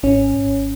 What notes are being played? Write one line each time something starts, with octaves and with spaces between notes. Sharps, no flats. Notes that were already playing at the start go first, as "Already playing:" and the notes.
G#1 C#4
G#1